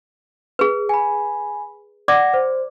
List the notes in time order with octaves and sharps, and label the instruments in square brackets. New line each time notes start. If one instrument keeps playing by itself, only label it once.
[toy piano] G#4 B4
[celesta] G#5 B5
[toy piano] D5 D6 [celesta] F#5 A#6
[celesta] C5